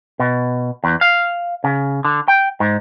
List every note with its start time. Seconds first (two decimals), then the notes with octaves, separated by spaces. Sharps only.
0.19 B2
0.84 E2
1.01 F5
1.64 C#3
2.05 D3
2.28 G5
2.60 G#2